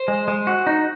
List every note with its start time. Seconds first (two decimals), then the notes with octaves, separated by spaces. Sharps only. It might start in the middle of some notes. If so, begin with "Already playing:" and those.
Already playing: C5
0.08 G#3
0.28 G#3
0.47 F#4
0.67 D#4